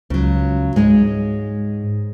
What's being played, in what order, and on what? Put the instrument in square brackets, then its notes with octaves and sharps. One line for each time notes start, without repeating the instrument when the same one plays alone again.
[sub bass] C#2 [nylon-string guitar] C#3 F#3
[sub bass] G#2 [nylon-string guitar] G#3 C#5 D#5